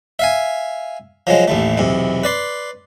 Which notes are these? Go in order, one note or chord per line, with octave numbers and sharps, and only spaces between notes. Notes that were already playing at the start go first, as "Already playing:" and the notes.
E5 F5 G#5
F3 F#3 G#3
A1 D#2 A3
B1 E2 C3
B4 D5 C6